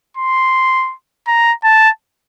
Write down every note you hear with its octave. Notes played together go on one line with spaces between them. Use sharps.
C6
A#5
A5